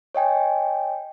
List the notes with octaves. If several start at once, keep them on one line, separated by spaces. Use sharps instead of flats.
C#5 D#5 G5 G#5